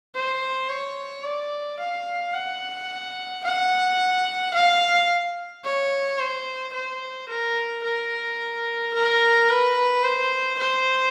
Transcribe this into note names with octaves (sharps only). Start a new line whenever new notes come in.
C5
C#5
D5
F5
F#5
F#5
F5
C#5
C5
C5
A#4
A#4
A#4
B4
C5
C5